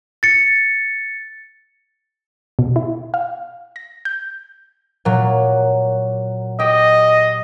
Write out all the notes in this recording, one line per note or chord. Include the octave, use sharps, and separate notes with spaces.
A6 C#7
B2
E4
F5
A#6
G6
A#2 F#3
G4 D#5